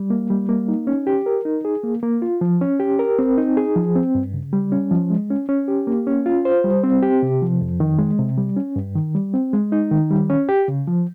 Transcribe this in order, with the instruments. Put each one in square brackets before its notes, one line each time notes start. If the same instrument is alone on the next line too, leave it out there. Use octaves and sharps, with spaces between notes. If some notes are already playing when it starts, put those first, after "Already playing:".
Already playing: [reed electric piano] G3
A#3
G3
A#3
D#4
C#4
G4
A#4
D#4
G#4
A#3
A#3
F4
F3
C#4
G4
A#4
C4
D#4
G#4
F3
C4
G2
C#3
G3
C#4
F3
G#3
C#4
C#4
G4
A#3
C#4
F4
C5
G3
C4
G4
C3
F3
F2
D#3
G#3
C3
G3
C#4
G2
D#3
G3
C4
G#3
D#4
D#3
G3
C#4
G4
C#3
F3